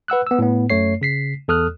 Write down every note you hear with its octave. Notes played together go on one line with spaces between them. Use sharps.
B4 F#5 E6 F#6
B3 E6
A2 B3
F#2 A3 C#5 C7
C#3 B6 C7
E2 A4 D#6 F6 F#6